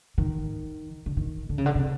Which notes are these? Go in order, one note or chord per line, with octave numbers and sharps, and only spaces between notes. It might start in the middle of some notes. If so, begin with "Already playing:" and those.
D#3
D3
D#3
D3
C#3
D3
C3